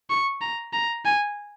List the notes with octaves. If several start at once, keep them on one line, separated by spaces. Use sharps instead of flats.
C#6
A#5
A#5
G#5